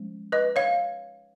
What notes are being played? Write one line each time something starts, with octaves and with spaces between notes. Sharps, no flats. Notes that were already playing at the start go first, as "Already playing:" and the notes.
Already playing: F3 G#3 C#4
B4 D#5
C#5 F5